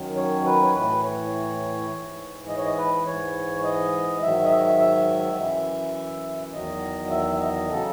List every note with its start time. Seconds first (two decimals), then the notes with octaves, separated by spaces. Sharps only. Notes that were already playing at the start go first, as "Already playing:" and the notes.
Already playing: F#2 D#3 F#3
0.16 C#5
0.46 B4
0.63 C#5
0.75 A2 E3 B4
1.03 C#5
1.90 G#2 E3
2.48 D#5
2.57 C#5
2.65 D#5
2.77 B4
3.06 G#2 E3 C#5
3.64 D#5
4.22 G#2 D#3 F#3 E5
4.44 D#5
4.50 E5
4.79 E5
5.38 F#2 E3
6.53 E2 D#3 F#3 D#5
7.11 E5
7.36 E5
7.40 D#5
7.69 C#3 F#3 A4